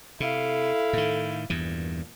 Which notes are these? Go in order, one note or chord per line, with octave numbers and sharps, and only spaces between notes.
C3 E4 A4 F5
A2 D#3
G#1 E2 G2 A#2 E3